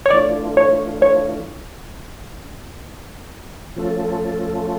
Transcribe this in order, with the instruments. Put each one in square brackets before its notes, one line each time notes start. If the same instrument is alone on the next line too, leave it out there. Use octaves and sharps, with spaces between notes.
[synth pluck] C#5
[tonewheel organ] E3 A3 D4 F4 [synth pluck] D5
[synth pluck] C#5
C#5
[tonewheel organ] F3 A3 C#4 F4 A4